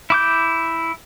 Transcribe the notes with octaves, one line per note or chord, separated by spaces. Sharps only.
E4 D6 G6